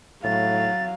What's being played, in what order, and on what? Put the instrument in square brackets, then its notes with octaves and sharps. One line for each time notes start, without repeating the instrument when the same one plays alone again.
[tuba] A2 [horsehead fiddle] F#3 F5 [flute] A6